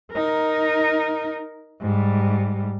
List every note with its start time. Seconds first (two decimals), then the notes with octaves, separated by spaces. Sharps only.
0.13 D#4 A#4
1.81 G#2 G3